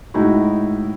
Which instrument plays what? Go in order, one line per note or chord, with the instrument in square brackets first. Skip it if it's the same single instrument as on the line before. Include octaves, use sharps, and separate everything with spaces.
[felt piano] A2 G#3 D#4 E4 F#4